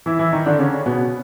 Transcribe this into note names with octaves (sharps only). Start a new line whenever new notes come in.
E3 E4
E3 E4
D#3 D#4
D3 D4
C#3 C#4
B2 B3